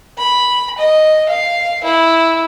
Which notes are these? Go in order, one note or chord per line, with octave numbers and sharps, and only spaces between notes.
B5
D#5
F5
E4